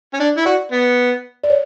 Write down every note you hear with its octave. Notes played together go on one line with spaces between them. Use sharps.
C#4
D4
E4
F#4 D5
B3
D5
C#5